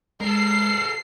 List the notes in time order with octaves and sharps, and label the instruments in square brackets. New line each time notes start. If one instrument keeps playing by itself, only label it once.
[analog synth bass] G#3 [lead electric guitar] A4 A#4 [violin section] C7